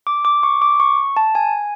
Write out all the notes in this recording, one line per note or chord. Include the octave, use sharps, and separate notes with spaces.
D6
D6
C#6
D6
C#6
A5
G#5